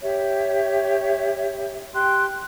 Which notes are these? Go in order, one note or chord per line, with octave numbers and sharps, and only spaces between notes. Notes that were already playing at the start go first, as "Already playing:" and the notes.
G4 C#5 E5
G4 G5 C6 F#6